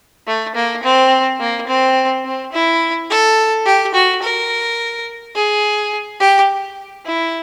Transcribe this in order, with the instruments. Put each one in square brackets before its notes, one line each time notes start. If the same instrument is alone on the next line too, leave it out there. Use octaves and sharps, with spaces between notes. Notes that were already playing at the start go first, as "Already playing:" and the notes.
[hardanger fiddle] A3
A#3
C4
A#3
C4
C4
E4
A4
G4
F#4
A#4
G#4
G4
E4